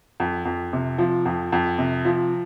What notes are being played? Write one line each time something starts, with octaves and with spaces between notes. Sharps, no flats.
F2
F2
C3
F3
F2
F2
C3
F3